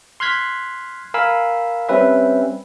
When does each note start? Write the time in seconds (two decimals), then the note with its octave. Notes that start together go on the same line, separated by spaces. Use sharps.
0.20 C6 F6 F#6 G#6 B6
1.14 A#4 F5 G#5 B5 E6
1.89 G3 C4 C#4 B4 E5